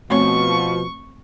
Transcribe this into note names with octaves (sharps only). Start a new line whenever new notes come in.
B2 F3 A3 C4 C#5 C#6